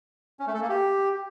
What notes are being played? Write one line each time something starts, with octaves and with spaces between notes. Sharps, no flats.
C#4
A3
A4
A#3
G4